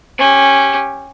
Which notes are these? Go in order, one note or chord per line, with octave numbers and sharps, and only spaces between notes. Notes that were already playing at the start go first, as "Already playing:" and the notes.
C#4 G4